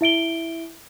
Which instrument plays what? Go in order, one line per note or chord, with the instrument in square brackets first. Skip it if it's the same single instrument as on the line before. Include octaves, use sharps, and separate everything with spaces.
[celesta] E4 E5 D7 G7